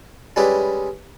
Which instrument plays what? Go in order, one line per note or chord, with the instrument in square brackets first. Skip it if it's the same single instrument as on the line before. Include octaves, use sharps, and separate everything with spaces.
[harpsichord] G3 G#3 C#4 E4 B4 D5